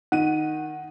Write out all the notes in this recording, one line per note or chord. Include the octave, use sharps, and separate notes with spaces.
D#3 D#4 F#5 D#7